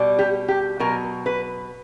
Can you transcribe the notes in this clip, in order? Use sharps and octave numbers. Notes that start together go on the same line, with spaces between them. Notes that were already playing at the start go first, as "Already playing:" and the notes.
Already playing: B2 G3
G4
G4
B2 F#3 A#4
B4